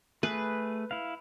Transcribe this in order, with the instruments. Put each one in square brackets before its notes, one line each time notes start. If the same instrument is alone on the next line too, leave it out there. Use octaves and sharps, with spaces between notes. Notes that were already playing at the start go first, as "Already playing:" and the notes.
[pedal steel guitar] A3 G#4 [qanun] B4
[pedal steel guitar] E4 F5